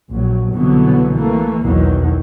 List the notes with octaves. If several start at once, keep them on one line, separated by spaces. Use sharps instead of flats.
A#1 F#3
C2 B2 D3 E3 F#3 B3
E3 A3 A#3
B1 E2 D#3 E3 F#3